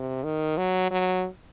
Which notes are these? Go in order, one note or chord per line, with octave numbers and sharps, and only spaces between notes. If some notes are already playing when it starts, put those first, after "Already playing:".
Already playing: C3
D#3
F#3
F#3